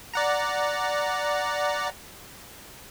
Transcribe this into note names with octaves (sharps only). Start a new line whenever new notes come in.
D5 F#5 A#5